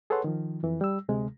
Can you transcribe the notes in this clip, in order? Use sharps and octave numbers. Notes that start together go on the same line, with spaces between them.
G#4 A4 B4 C#5 F#5 C6
D#3 F3
F2 E3
G3 E6
D2 C3 G#3